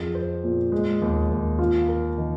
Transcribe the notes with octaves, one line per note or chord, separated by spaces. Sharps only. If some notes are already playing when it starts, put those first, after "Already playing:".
Already playing: F2 G#4
C5
A#2
G#3
D#2
D#2
F4
A#4
D#3